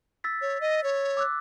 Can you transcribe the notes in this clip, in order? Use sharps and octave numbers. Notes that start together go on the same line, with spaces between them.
E6 A6 B6
C#5
D#5
C#5
D6 E6 F#6